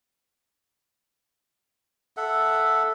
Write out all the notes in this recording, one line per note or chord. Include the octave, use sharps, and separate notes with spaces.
A4 E5 F#5